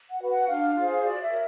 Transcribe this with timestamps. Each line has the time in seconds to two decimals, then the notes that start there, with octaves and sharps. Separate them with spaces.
0.11 F#5
0.20 F#4 B4
0.29 F#5
0.48 D4 F5
0.75 F4 G#4 C5
1.03 F#4 D5
1.21 E5
1.30 A#4 C#5